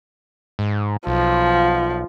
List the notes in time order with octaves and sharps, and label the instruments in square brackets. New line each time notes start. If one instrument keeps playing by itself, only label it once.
[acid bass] G#2
[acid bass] B1 [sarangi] F3